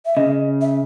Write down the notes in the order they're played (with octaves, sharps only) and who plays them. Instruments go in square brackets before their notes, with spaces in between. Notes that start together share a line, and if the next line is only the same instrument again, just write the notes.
[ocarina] E5
[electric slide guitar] C#3 [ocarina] D#5
[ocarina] E5